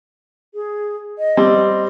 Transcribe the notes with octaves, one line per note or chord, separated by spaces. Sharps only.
G#4
D#5
G3 C4